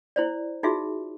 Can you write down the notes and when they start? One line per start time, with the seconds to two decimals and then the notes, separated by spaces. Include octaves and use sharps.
0.16 E4 C5 D5
0.63 D#4 F4 F#4 G#4 E5